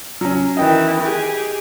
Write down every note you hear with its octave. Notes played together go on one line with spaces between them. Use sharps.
F#3 C#4
D#3 E3 D#5 G5
G4 G#4